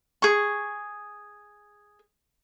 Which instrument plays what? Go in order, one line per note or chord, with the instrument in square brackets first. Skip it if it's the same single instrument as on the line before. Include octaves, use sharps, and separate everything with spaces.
[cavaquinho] G#4 C#6